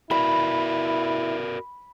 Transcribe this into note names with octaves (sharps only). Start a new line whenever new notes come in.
E4 F#4 A#4 D5 B5